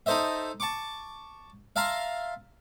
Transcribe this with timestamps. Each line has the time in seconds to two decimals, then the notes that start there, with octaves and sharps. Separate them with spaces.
0.06 D#4 A4 C5 D#5 E5
0.60 A5 C#6 D6
1.76 E5 F5 A5 A#5 C6